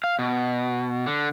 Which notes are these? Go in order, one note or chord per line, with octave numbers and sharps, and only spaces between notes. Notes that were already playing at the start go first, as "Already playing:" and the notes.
F5
B2
D3